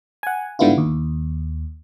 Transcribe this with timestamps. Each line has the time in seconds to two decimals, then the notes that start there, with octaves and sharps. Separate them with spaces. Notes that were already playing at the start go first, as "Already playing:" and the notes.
0.23 F#5 G#5
0.59 G#2 D3 G3 B3 E4 F4
0.78 D#2